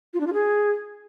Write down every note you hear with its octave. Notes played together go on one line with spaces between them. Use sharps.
F4
D4
F4
G#4